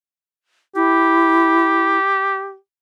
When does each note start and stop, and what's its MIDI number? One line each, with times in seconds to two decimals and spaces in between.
0.76 1.98 64
0.76 2.55 67